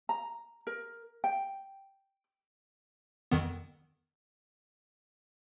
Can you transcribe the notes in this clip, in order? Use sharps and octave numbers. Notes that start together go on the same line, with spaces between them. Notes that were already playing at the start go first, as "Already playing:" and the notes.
A#5
A#4
G5
F2 D#3 B3